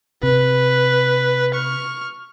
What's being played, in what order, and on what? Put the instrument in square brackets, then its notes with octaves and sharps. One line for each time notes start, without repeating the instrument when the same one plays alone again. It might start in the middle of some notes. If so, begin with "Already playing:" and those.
[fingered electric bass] C3 [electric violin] B4
[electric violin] C#6 F6